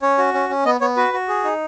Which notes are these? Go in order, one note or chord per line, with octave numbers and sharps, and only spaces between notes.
C#4 C#5
F#4
C#4
C#4
B3 D#5
B3 C#5
F#4 B4
F#4
G#4
D#4